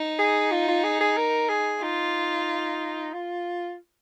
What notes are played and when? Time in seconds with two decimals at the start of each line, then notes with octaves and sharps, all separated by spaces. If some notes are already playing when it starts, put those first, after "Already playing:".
Already playing: D#4
0.19 G#4
0.52 F4
0.68 F4
0.84 G#4
1.01 G#4
1.17 A#4
1.49 G#4
1.82 D#4 F4
3.13 F4